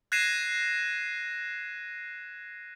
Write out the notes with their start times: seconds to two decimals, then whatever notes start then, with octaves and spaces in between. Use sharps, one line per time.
0.12 F#6 G#6 A#6 C7 D#7 E7